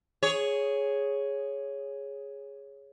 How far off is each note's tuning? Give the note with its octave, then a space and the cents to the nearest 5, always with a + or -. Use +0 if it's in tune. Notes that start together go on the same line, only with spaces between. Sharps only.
G#4 +0 C#5 +0